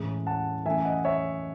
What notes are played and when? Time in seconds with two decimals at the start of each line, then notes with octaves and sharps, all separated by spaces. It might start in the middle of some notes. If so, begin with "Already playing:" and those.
Already playing: A2 E3 G#3 C#4
0.27 F#5 A5
0.66 F#2 E3 A3 E5 G#5
0.85 D#5 F#5
1.05 C#5 E5